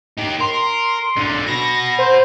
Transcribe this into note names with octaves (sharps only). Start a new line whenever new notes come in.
D#4 G4
A#4 C6
B1 D3
F#4 B4 A#6
C5